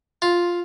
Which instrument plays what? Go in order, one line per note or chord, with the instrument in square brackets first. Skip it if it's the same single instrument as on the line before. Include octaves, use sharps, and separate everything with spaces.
[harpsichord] F4